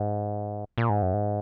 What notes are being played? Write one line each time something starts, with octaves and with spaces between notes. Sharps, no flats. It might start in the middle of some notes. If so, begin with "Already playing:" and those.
Already playing: G#2
A#2
G#2
F#2
G#2